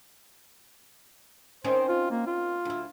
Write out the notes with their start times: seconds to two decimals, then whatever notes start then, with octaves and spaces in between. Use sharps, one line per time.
1.64 D#3 C4 C#4 C5
1.89 F4
2.11 A#3
2.27 F4
2.65 D2 E4